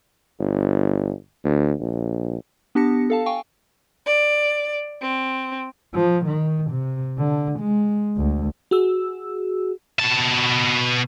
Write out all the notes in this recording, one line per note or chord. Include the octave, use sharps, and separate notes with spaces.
G1
D2
A#1
B3 D4 G4 A5 A#6 C#7
A4 F5 A5
F5 G5 G#5 C#6
D5
C4
F3
D#3
C3
D3
G#3
D2
F#4 G#4 E6
B2 A5